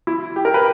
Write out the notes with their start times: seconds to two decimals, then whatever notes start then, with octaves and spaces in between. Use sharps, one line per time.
0.07 E4
0.36 G4
0.45 A#4
0.54 B4